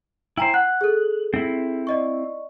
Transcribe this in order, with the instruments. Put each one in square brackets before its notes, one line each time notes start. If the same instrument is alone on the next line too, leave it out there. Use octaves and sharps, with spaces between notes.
[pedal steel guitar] E4 C5 [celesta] G5 G#5 A#5
[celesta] F#5 [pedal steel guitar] F#6
[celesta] G#4 A4
[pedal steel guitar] C4 E4
[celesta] D5 D#5 C#6